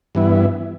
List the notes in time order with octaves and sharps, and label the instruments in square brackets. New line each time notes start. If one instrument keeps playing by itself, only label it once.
[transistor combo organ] G2 E3 B3 E4